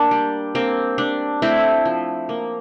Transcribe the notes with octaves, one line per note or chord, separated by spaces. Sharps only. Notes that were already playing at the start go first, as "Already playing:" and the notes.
Already playing: A#3 D4
G3
A#3 C4
G3 D4
A3 C4 E4
F3
A#3